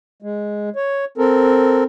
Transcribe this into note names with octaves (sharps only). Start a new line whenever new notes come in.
G#3
C#5
C4 A4 A#4